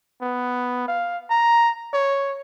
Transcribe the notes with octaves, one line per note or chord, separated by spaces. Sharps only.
B3
F5
A#5
C#5